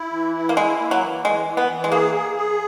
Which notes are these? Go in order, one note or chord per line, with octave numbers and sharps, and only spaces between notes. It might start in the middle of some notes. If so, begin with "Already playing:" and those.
Already playing: E4
E3
E4
A#3
G#3 E4
A#3
F#3
E3
E3 G#3
E3
B3
E3
G#3
A#3 G#4
G#4
G#4